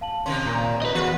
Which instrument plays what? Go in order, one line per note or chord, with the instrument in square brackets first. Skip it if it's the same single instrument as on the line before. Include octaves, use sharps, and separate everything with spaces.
[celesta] F5 A5 F#7
[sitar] C3 D#3 C#4 [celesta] C6
[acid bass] A#2 [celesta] A#4 A#5 G6
[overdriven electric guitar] B4 D#5
[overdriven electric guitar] E2 [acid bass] F#4 [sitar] B4